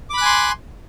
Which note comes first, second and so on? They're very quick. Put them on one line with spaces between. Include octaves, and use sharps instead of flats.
D6 B5 F#6 G#5 C6